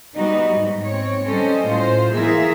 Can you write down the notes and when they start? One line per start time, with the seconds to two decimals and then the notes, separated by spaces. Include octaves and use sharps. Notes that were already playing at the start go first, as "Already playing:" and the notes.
0.16 G3 B3 D#4 F#4
0.55 G#2
0.84 C4 C#5
1.25 G3 C#4 A4 C5 D#5
1.66 A2 F4 C5
2.12 E3 B3 G#4 A#4 E5 F5